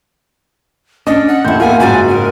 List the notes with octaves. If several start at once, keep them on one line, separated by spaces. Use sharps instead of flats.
C#4 D4 D#5
F#5
D#2 C4 E4 G6
A#3 B3 F4 F#5 G#5
F#1 G#2 C4 F#4 G#5 A6
A#4